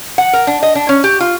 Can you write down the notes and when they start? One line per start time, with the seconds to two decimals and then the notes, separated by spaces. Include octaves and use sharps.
0.18 F#5
0.33 A#4
0.47 D4
0.63 D#5
0.75 D4
0.89 C#4
1.04 G4
1.20 F4